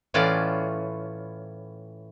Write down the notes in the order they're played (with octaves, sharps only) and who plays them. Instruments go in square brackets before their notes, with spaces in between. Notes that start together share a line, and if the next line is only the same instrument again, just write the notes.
[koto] A2 E3 C#4 F4 D5